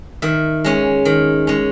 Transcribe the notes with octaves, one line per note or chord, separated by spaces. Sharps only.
D#3 E5
G#3 C#4
D#3
G#3 C#4